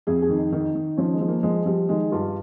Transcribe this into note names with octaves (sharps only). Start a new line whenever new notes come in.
F2 G#4
G#4
D#3
D#4
D#3 D#4
D#3
F3 C#4
G#3
F3
A#3
F3 G#3
F3 G3
D#3 G#3
G2 F4